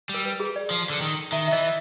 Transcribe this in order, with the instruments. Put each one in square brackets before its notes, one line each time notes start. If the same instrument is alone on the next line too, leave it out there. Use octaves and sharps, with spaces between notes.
[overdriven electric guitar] G3
[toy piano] A#4
B4
G#4
D5
[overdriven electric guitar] F3
D3
D#3
[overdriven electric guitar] D#3 [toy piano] E5
[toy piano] E5
[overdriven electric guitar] E3 [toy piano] D#5